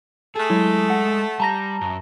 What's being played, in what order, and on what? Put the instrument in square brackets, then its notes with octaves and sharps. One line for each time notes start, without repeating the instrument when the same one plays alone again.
[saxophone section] A3 A4 [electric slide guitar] G#4
[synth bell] F#3 E4 [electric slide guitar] G#3
[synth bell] F#5
[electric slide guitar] G3 [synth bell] A5 A#5 A#6
[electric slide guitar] F#2